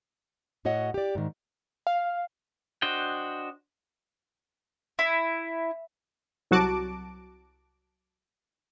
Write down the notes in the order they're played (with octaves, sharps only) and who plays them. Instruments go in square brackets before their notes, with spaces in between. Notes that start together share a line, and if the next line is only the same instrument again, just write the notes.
[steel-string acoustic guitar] A2 F#4 C#5 D#5 F#5
G4 D5
G#2 D#3
[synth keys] F5
[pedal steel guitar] D4 F#4 C5 D#5 G5
[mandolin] E4
[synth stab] C2 F#3 F#4 A5 D6 D7